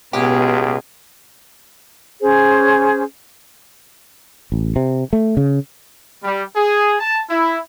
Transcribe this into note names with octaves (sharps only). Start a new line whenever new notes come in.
C#2 B2 B3 G4 G#4
C#4 G#4 C5
A1
C3
A3
C#3
G3
G#4
A5
E4